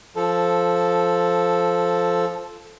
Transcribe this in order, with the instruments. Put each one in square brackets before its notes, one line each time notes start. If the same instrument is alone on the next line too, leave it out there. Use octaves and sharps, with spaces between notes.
[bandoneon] F3 A4